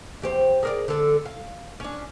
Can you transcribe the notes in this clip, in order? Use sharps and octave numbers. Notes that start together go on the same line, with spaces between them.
E2 G4 C5
G#4 A#4 D5
D3 A4
F5
C#4 D4